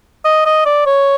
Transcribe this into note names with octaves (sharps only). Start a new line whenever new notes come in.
D#5
D#5
D5
C#5